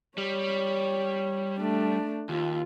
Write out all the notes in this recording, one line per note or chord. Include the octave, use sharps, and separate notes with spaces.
G3 C#5
A3 D4
D#2 F4